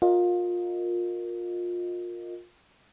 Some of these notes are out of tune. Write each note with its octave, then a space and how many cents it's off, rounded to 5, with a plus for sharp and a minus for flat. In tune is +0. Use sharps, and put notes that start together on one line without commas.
F4 +25 A#4 +0 D#5 +0